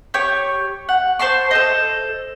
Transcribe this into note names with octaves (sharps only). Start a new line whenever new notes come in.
G4 C#5 C#6
F#5
C5 A5 C6 C#6
A4 C5 D#5